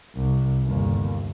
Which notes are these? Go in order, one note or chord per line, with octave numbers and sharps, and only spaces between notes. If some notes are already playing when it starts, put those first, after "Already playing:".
C2
G1 D#2